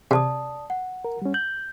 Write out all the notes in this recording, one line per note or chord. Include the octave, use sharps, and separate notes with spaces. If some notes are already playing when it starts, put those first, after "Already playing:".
C3 D5 A5 D#6
F#5
A#4
G3 C#4
G6 F#7